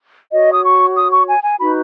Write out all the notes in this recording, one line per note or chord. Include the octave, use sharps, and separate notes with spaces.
F#4 C#5 D#5
D#6
C#6
D#6
C#6
G#5
G#5
D#4 F#4 B4 B5